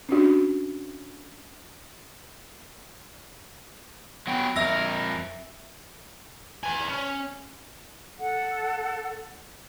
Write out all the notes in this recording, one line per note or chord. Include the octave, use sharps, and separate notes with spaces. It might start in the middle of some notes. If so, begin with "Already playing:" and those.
C#4 D4 F#4
F#3 B3 G5
F2 A#4 E5 E6 A#6
B3 G#5
C#4
A4 F#5